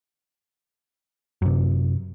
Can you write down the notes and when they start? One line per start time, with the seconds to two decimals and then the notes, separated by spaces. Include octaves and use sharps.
1.42 F#2 C3